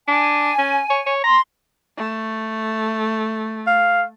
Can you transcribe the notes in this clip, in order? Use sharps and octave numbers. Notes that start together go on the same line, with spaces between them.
D4 G#5
C#4
C#5
C#5
A#5 C6
A3
F5